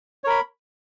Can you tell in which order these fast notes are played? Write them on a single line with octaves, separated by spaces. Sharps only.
C#5 A#4 B5